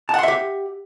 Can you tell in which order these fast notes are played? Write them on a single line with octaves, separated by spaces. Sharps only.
A5 F#5 C6 E5 G4